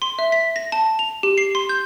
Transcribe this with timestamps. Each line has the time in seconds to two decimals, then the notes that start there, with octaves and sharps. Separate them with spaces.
0.02 C6
0.19 E5
0.32 B6
0.56 A#6
0.72 A5
0.99 F7
1.23 G4
1.38 C7
1.55 C6
1.69 G6